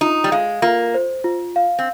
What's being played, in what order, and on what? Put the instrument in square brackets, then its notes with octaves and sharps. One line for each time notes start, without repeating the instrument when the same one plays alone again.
[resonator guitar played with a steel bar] D#4 [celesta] F4
[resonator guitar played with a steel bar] G3
[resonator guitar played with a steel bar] G#3 [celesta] F5
[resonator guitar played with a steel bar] A#3 [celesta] F4
[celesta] C5
F4
F5
[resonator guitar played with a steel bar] C4